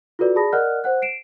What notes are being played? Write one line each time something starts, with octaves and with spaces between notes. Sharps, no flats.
F4 F#4 A4 B4 D5
G#4 D5 A5 B5 D#6 A#6
A#4 D5 D#5 F#5 F6 F#6
C5 F#5 F#6
C7 D7 E7